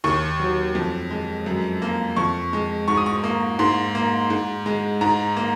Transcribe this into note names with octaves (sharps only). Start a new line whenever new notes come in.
D#2 C#6
F#3
F2
G#3
F#2
A#3
F2 C#6
G#3
G#2 C#6
D#6
C#6
A#3
G#2 C6
A#3
G#2
G#3
G#2 A#5
A#3